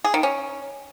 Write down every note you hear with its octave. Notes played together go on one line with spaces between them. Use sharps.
G#4
D#3
C#4